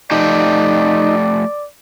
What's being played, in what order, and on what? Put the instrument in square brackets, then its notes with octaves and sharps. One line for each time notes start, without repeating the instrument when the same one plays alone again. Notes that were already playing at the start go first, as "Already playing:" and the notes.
[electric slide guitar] F3 A3 G4 [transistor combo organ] D#4 [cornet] D5